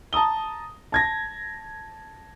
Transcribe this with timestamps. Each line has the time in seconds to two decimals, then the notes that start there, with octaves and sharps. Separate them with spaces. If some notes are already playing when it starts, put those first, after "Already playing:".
0.13 A5 A#5 D#6 G7
0.92 A5 G#6 A#6